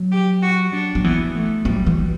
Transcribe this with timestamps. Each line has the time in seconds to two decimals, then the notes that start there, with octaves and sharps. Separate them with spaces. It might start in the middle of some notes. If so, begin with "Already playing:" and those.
Already playing: F#3
0.12 G4
0.42 F#4
0.73 D4
0.95 F#3
1.04 E3 B3
1.35 A3
1.65 F#3 G3
1.86 E3